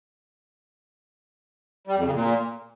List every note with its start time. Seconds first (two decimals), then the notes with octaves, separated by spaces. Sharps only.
1.87 G3
1.96 F2
2.05 C#3
2.14 A#2